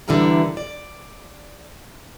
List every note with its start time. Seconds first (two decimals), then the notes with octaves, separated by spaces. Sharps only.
0.08 D3 E3 G3 E4 A#4 A#5
0.57 D5